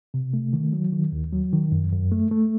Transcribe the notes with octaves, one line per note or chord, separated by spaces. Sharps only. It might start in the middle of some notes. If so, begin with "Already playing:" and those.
C3
A3
D#3
F#3
D#3
D#2
F#3
D#3
F#2
F#2
A3
A3